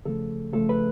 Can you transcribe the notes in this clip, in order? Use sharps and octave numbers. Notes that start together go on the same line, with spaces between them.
C#3 F3 A3 A4
C#3 F3 A3 A4
B4